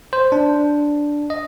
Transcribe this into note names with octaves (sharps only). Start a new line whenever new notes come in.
C5
D4
D#5